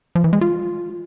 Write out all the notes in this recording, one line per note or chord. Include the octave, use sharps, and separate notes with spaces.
F3
E3
G#3
F4